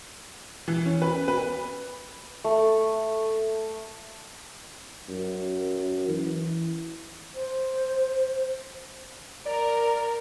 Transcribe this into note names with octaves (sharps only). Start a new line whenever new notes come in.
E3
C#4
B4
B4
A3
F#2
E3
C5
A#4 D5